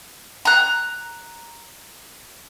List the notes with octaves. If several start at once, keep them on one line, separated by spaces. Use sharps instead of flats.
A#5 F#6